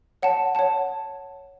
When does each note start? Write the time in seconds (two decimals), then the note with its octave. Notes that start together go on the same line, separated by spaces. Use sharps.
0.22 C#5 F#5 A5
0.55 C#5 F#5 A5